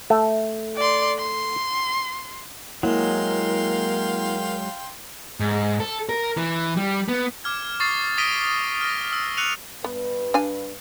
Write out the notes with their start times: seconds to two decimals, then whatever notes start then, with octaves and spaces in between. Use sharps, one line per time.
0.10 A3
0.76 D5 C6
1.18 C6
2.83 F#3 G#3 A#3 E4 A#4 F5 G5 C6
5.40 G#2
5.80 A4
6.09 A#4
6.37 E3
6.77 G3
7.08 B3
7.44 D6 F6 G#6
7.80 C#6 D#6 A6 C7
8.18 D#6 A#6 B6 D7 D#7 G7
8.81 F6 A#6
9.13 E6
9.37 E6 F#6 C#7 D#7 F7
9.84 G2 B3 B4
10.34 D4 F5 G#5